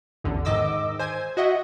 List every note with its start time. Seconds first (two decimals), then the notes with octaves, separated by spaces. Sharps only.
0.24 A1 E2 D3
0.45 G#2 D#3 D#5 D6 E6
0.99 C5 G#5 G#6
1.37 F#4 D#5 E5 F#5